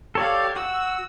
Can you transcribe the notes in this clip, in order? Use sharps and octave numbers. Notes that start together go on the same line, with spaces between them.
G4 A4 C#5 D5 F5
F#4 E6